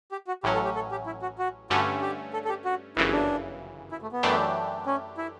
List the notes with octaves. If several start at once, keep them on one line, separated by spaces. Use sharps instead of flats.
G4
F#4
A1 A2 F#3 C#4 G4
A4
G4
A4
G4
E4
F#4
F#4
G2 D3 A3 C#4 F#4
G4
A4
A4
G4
F#4
G1 F#2 C#3 E3 E4
D4
E4
A3
B3
F#2 E3 A3 D4 G4
C#4
E4